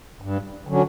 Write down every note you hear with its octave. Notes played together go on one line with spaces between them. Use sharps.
G2
D3 F#3 C#4